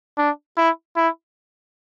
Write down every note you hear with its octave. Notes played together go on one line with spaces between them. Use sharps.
D4
E4
E4